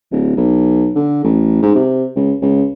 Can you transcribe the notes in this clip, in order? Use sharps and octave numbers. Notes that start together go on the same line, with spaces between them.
D1
B1
D3
A1
G#2
C3
C#2
C#2